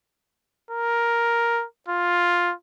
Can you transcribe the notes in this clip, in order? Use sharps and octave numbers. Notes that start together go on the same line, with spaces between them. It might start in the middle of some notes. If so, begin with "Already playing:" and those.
A#4
F4